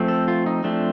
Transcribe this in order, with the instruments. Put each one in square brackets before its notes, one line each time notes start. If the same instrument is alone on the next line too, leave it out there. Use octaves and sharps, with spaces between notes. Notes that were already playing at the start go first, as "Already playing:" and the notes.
Already playing: [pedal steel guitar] F3 A3 C4
A4
F4
D#4
F3 A3 C4 D4